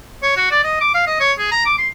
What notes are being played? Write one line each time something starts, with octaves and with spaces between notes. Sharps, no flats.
C#5
F#4
D5
D#5
D6
F5
D#5
C#5
G#4
A#5
D6
C6